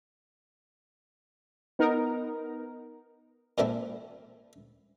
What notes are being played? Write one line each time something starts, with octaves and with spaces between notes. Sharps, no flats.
B3 D#4 A#4
A#2 E3 A3 C4 D4 E4